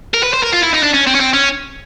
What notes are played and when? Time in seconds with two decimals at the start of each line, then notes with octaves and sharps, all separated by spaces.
0.14 A#4
0.23 B4
0.34 C5
0.44 A#4
0.53 F4
0.64 E4
0.74 D#4
0.84 D4
0.94 C#4
1.07 C4
1.15 C#4
1.20 C4
1.33 C#4